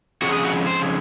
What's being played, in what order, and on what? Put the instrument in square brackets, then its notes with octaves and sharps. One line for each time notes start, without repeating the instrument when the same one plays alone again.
[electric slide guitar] F2 C#3 G#3 F#4
G#4
F#4
C5